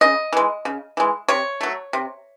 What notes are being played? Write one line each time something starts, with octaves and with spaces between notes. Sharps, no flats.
C#3 D#5
E3 G#3
C#3
E3 G#3
C3 C#5
F#3 A3
C3